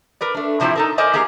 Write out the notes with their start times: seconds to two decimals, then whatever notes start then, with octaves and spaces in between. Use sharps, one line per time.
0.21 A#4 B4 D5
0.34 A3 D4
0.60 A2 C3 F3 F#3 C4 E4
0.75 D#4 A4 A#4
0.98 A#4 C5 D5 D#5 G#5
1.13 A#3 G4 G#4 A#4